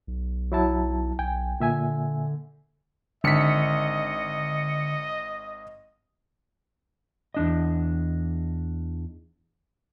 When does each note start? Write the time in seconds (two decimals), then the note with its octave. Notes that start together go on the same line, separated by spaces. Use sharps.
0.07 B1
0.52 F#3 E4 A5
1.19 B1 G5 G#5
1.60 A#2 D3 E5 G#5
3.24 G#1 D3 D#5 B6 C#7
7.34 E2 D4 D#5